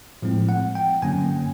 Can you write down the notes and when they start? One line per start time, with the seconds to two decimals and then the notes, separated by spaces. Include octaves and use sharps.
0.22 A2 F3 G#3 C4
0.49 F#5
0.75 G5
1.02 G2 D3 F#3 A#3 C#4 G#5